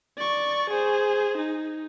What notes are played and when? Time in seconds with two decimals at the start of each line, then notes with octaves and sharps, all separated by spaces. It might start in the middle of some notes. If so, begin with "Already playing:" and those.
0.18 D5 C#6
0.70 G#4 C5
1.37 D#4